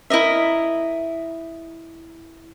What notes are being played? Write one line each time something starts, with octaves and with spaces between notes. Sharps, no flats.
E4 A#4 D#5 E5